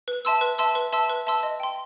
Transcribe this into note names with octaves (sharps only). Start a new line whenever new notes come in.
B4
E5 A5 C6 E6
B4
E5 A5 C6 E6
B4
E5 A5 C6 E6
B4
E5 A5 C6 E6
D#5
G5 C6